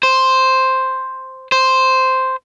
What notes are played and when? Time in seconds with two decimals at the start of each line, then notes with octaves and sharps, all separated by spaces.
0.03 C5
1.52 C5